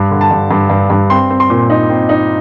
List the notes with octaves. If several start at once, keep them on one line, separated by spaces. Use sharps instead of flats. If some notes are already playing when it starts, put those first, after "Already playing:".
Already playing: G2
D3
A5
G2
G2
G2
G2
C4 C6
C4
C6
A#2
D#4
C4
D#4